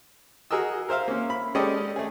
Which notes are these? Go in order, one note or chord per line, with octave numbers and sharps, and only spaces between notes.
F#4 G#4 A#4 D#5 E6
A#4 C5 E5 F5
A#3 C#4
B5
G#3 C#4 G4 A4 D5 D#5
A3 G#4